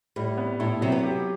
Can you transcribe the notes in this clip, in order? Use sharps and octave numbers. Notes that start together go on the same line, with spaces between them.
A2 G3
B3
A2 E4
C3 F#3
B3
G4